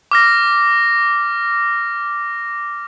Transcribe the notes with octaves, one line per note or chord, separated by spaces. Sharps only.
D6 F6 A#6